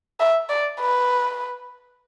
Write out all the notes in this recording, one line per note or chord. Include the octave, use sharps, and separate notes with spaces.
E5
D5
B4